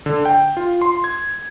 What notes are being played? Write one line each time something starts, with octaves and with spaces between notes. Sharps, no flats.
D3
G5
F4
C6
G#6